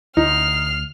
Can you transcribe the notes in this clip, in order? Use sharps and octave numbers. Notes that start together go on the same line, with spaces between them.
D2 D#4 F6 C7